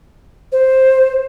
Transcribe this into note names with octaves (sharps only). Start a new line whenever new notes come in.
C5